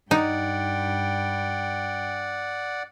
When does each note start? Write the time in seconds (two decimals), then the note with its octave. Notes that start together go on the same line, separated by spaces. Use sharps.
0.11 G2 D#4 D5 F#5 G5